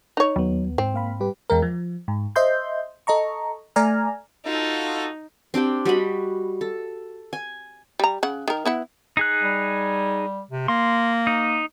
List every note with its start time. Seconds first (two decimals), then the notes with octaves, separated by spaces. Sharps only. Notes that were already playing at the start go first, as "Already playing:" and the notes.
0.17 D#4 C#5
0.36 D#2 F#3 B3
0.78 G#2 C4
0.94 A#3 F5 B5
1.20 G3 G4 B4
1.50 E2 G#3 A#4
1.62 F3
2.08 G#2
2.36 C5 D#5 E5 C6 G6
3.07 A4 D#5 A#5 C#6
3.76 A3 D5 G#5 A#5 F6
4.46 D#4 F4 F#4 A4
5.54 C4 D4 G4 G5
5.85 G3 F#4 D#5 B5
6.61 A4
7.33 G#5
7.99 G3 A#5
8.23 C#3 F#5
8.48 D#3 A#4
8.66 B3 E4 F#5
9.17 D#4 G#4 F#6
9.43 G3
10.51 C3
10.68 A#3 C6
11.27 D#4